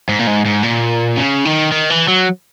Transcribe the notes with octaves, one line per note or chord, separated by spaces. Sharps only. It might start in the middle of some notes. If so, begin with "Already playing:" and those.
G#2
A#2
G#2
G#2
A#2
C#3
D#3
D#3
E3
F#3